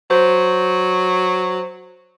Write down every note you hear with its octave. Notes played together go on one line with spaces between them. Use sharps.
F#3 C5